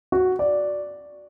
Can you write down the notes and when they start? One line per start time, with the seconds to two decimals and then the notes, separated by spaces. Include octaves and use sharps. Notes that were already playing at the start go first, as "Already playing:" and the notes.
0.12 F#4
0.39 D5